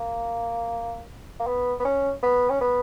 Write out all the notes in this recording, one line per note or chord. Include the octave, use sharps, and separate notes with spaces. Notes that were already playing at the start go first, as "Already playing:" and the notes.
Already playing: A#3
A#3
B3
B3
C#4
B3
C#4
B3